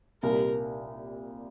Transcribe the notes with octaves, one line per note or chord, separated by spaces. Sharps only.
C2 A#2 G3 A#4